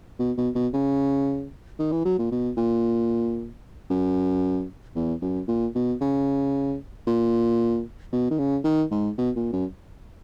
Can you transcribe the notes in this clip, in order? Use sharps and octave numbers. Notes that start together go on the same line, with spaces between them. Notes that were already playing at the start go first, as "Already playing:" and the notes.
B2
B2
B2
C#3
D#3
E3
F#3
A#2
B2
A#2
F#2
E2
F#2
A#2
B2
C#3
A#2
B2
D#3
C#3
D#3
G#2
B2
A#2
F#2